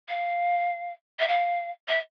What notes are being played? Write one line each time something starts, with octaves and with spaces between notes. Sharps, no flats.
F5
E5
F5
E5